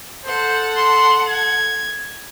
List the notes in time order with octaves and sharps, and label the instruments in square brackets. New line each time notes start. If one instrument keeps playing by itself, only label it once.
[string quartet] A4 F#5 [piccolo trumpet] C5
[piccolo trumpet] C6
G#6